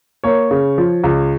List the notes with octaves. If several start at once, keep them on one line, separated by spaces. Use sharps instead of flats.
A#3 C#5
C#3
F3
C#2